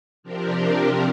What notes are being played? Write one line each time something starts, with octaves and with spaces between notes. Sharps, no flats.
C3 F3 C4 D4 G4 A#4